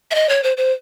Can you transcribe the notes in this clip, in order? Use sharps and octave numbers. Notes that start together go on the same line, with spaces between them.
E5
D#5
C#5
C5
C5